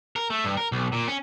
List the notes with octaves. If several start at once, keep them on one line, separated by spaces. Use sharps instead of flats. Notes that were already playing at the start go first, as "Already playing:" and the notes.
A#4
A3
G2
A#4
B1
A#2
C#4